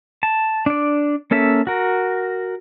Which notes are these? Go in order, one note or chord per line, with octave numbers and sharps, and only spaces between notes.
A5
D4 D5
A#3 C#4 A4 E5
F#4 A#4